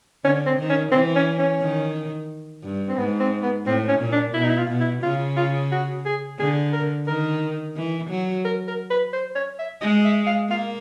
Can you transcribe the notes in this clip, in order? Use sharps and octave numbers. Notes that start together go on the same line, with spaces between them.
D3 C#4
C4
D#3
C#4
E3 C4
C#4
C#4
D#3
G2
C4
G#2 B3
C4
B3
A2 C4
C#4
A#2
D4
B2 E4
D#4
E4
F4
B2
E4
C#3 F4
F4
F#4
G#4
D3 G#4
A#4
D#3 A#4
E3
F#3
A#4
A#4
B4
C5
C#5
E5
G#3 D#5
E5
F5
A#3 F5